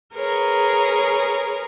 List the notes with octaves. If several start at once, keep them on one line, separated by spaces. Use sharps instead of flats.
G#4 A#4 B4 C#5